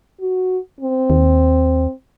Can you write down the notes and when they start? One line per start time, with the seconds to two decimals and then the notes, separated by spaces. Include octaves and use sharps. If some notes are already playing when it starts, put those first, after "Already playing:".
0.20 F#4
0.81 C4
1.10 D#2